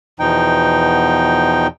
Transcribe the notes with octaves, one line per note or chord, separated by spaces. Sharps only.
E2 B2 F3 D#4 G5